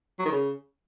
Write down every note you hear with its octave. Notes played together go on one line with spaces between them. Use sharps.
F#3
D#3
C#3